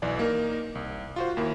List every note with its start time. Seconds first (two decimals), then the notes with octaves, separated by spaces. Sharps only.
0.02 B1 E3 D5 G#5
0.19 A#3 D#4 A#4
0.75 C2
1.16 F4 F#4 C5
1.37 D#2 A#3 E4 A#4